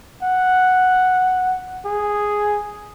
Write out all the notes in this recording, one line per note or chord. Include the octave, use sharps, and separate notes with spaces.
F#5
G#4